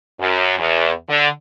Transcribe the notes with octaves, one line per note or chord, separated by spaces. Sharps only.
F#2
E2
D3